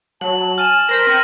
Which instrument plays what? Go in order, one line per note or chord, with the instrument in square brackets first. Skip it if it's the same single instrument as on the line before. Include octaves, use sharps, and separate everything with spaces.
[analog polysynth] F#3 [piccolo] A5 [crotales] F#7
[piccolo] G#5 [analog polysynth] A5 [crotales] F6 D#7 E7
[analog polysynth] A#4 C5 B5 [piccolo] A#6
[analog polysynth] C4 G#6 C#7 [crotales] D#7